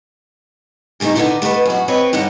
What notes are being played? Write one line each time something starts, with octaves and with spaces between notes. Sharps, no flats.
A2 C#3 A3 A#3 D#4
D3 D#3 F3 G3 B3 D#4
A3 B3 A#4 B4 D#5
F#2 F#4
C4 G4 B4 C#5 D#5
G2 D3 B3 D#4